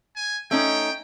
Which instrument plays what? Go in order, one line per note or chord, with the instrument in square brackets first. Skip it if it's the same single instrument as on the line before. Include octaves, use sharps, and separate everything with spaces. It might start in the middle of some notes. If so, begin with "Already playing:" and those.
[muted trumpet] G#5
[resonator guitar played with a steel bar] A3 C#4 D#4 [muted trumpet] G5